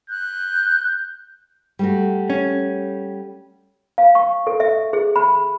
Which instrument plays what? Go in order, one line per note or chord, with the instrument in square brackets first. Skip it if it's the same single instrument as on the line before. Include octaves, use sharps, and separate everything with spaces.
[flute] F#6 [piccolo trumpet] G6
[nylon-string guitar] G3 A3 F#4
[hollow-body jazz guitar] C#4
[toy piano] F5
C#6
A4
E5
G#4
B5